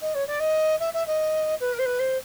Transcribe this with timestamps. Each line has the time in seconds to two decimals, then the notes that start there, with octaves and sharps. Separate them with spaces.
0.01 D#5
0.14 C#5
0.27 D5
0.40 D#5
0.79 E5
0.93 E5
1.07 D#5
1.60 B4
1.73 A#4
1.78 C5
1.85 B4
1.99 C5